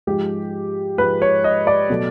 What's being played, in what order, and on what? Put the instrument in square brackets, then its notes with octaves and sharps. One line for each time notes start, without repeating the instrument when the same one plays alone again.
[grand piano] G#2 F3 G#3 G4
G#2 F3 G#3 B4
C#5
D#5
D5
B2 F#3 A3